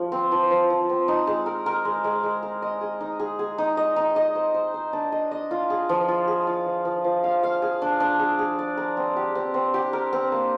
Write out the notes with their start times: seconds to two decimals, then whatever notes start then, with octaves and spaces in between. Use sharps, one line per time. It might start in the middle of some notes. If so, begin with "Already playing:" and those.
Already playing: F3
0.12 C4
0.32 F3
0.50 F3
0.70 F3
0.89 C4
1.08 D#4
1.27 G#3
1.46 A#4
1.66 A#4
1.85 G#3
2.04 G#3
2.23 G#3
2.43 A#4
2.62 D#5
2.81 G#4
3.01 D#4
3.20 G#4
3.39 G#4
3.58 D#4
3.77 D#5
3.96 D#4
4.16 D#5
4.35 C5
4.54 C5
4.74 C5
4.93 D4
5.12 D#5
5.31 D#5
5.51 F4
5.70 G#4
5.89 F3
6.08 F4
6.28 G#4
6.47 F4
6.66 F3
6.85 F3
7.04 F3
7.24 F5
7.43 F5
7.62 G#4
7.82 D4
8.00 D4
8.20 G#4
8.39 G#4
8.59 D5
8.77 A#4
8.97 C4
9.16 G4
9.35 C4
9.54 C4
9.74 G4
9.93 A#4
10.13 C4
10.32 A#3